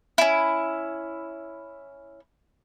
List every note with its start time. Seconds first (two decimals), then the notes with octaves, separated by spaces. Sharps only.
0.18 C#4 E4